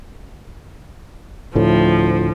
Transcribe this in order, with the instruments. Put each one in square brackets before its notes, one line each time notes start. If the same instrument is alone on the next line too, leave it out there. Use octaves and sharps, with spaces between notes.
[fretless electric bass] D2 A2 [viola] F3